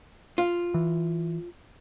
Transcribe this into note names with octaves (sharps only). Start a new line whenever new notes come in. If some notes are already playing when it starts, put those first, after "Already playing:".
F4
E3